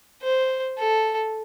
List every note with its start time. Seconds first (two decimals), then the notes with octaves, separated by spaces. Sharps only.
0.22 C5
0.77 A4